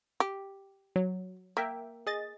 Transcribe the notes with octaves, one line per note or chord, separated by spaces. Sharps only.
G4
F#3
A#3 A#4 E5 G5
G#4 D#5 A6